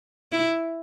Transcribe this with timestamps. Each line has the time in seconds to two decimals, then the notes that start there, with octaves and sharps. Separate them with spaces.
0.32 E4